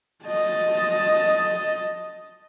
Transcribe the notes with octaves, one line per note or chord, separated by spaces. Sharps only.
D#5 A5